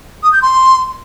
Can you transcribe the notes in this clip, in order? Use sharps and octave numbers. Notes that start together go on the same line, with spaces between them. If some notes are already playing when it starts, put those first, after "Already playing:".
D#6
G6
C6